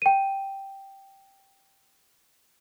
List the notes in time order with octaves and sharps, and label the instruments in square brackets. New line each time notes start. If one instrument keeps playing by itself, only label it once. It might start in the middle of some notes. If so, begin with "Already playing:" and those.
[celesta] G5 D#7